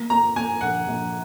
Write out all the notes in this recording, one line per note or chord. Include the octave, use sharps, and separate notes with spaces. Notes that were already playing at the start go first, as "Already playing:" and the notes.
Already playing: A#3
A#3 A#5
A#3 G#5
A#1 F#5
A#1